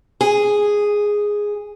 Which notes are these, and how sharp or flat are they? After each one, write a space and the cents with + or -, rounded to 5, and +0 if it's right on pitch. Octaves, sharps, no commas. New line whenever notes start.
G#4 -5